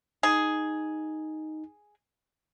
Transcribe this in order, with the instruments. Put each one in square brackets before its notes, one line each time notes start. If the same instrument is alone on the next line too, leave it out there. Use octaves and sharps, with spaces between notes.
[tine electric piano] D#4 [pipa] G#4